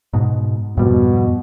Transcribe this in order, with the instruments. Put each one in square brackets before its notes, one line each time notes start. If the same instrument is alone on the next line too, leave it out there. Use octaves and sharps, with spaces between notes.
[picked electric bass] G#2 B2
[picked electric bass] F2 G#2 G3 [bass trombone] B2